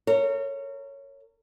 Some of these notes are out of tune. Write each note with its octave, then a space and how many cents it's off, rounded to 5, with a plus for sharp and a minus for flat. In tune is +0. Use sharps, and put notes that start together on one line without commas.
A#4 -35 C#5 +0